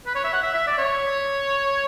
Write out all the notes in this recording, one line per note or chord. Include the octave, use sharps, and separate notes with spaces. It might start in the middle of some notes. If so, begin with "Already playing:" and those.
B4
C#5
E5
F#5
E5
E5
D5
C#5